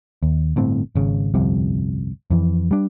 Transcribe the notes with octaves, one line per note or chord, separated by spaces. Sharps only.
D#2
G1 A2 C4
G#1 C#3
G1 C2 F2 C3
F2 E3
G3 D4